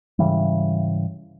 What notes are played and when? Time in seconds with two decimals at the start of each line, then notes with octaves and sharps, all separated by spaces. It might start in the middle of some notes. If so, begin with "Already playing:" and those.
0.19 G#2 C#3 E3 G3